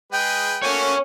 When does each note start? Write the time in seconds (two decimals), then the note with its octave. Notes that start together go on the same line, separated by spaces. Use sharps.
0.12 G#3 G#4 B4 G5
0.62 A3 A#3 F#4 C#5 G#5